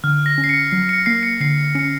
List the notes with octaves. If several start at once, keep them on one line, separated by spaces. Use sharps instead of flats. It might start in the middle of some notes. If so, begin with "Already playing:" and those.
D3 F6
A#6
C#4
C7
C#7
F#3 C7
C#7
A#3 C7
C#7
D3 C7
C#4 C#7